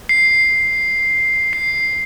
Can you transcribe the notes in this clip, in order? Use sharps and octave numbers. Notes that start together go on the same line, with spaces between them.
C7
C7